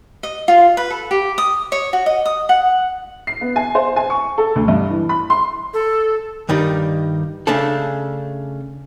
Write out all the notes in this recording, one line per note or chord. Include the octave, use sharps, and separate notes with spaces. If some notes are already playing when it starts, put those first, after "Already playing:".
D#5
F4
B4
A4
G4
D#6
C#5
F#4
D#5
D#6
F#5
C7
B3
G#5
C5
G#5
C#6
A4
D2
G2
E3
B5
C6
A4
G2 D#3 G3 D#4
C#3 A3 D4 A4